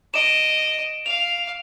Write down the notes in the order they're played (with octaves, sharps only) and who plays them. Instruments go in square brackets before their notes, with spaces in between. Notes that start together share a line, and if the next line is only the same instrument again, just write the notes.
[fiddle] D#5 [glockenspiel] D7 E7
[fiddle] F5 [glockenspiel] F7